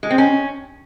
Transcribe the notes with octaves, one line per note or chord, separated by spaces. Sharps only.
G#3
C4
C#4